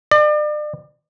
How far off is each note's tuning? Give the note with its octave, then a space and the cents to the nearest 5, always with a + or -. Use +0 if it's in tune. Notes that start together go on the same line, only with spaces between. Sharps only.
D5 +40